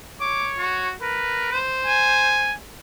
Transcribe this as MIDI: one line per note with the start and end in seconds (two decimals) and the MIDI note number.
0.21 0.88 73
0.21 0.50 86
0.58 0.92 66
1.02 1.49 70
1.02 1.58 71
1.52 2.54 72
1.86 2.53 80